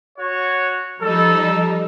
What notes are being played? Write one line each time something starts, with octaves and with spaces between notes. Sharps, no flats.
F#4 C#5
F3 G3 D#4 A4